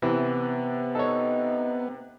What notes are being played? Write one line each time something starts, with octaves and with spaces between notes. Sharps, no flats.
C3 E3 B3
D#4 A4 C#5